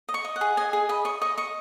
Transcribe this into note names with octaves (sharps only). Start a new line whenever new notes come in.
D#5
C#6
D#5
F#5
G#4
D#5 G#5
G#4
D#5 B5
D#5 C#6
D#5 C#6
D#5 C#6